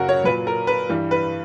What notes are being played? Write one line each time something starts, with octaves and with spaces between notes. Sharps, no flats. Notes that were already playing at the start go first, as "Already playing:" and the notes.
Already playing: F#2 C#3 F#3 F#4 A#4
C#5
A#2 F#3 B4
A#4
B4
G2 E3 G3
B4